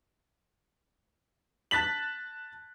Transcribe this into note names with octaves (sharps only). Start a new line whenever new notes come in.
A5 F#6 A6 B6 F#7